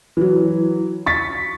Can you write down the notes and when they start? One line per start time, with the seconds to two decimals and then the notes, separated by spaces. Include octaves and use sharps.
0.17 E3 F#3
1.06 C#6 A6 B6